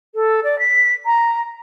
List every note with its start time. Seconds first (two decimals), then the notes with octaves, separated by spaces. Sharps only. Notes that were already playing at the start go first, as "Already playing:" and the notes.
0.15 A4
0.43 D5
0.58 B6
1.05 A#5